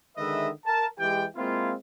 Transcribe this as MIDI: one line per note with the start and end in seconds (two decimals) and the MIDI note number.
0.18 0.49 50
0.18 0.49 51
0.18 0.49 56
0.18 0.49 71
0.18 0.49 75
0.18 0.49 76
0.66 0.86 70
0.66 0.86 81
0.99 1.26 52
0.99 1.26 56
0.99 1.26 67
0.99 1.26 79
1.37 1.74 56
1.37 1.74 58
1.37 1.74 60
1.37 1.74 64
1.37 1.74 65